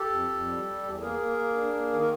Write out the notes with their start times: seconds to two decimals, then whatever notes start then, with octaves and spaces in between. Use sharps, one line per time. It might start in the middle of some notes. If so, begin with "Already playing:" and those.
Already playing: G4 A4
0.09 F2
0.29 F2
0.46 G3
0.65 G3
0.83 E2
1.01 A#3 G#4 A#4
1.19 A#3
1.37 A#3
1.55 D4
1.73 A#3
1.92 D#3
2.00 A#4